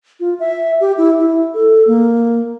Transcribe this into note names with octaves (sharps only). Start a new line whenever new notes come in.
F4
E5
G4
E4
E4
A4
A#3